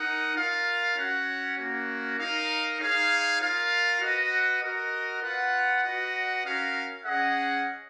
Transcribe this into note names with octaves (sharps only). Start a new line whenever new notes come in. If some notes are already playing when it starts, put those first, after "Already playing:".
Already playing: D#4 A#4 D#5 F#5
F4 A#4 F5
C#4 F#4 C#5 F#5
A#3 C#4 F#4
D#4 A#4 F5
D#4 G#4 C#5 F5
F4 A#4 F5
F#4 B4 D#5 F#5
F#4 A#4 D#5 F#5
F4 B4 F#5
F#4 B4 D#5 F#5
C#4 F#4 A#4 F5
C#4 G#4 D#5 F#5